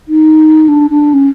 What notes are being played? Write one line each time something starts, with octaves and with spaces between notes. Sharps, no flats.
D#4
D4
D4
C#4